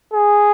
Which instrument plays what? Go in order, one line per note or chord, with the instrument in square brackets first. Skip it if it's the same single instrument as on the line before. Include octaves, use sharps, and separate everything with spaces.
[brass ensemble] G#4